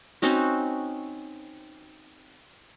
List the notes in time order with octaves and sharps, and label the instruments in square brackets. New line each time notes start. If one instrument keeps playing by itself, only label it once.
[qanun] C4 C#4 D#4 F#4